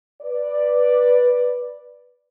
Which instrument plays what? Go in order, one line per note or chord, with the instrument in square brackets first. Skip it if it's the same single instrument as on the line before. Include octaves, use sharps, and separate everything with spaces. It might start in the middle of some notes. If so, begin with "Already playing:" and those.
[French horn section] B4 D5